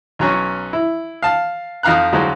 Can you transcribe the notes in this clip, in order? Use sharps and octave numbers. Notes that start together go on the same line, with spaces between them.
B1 F#3 C#4
E4
F5 A5
F2 D#4 F5 A#5 F#6
D2 F3 F#3 G#3 C5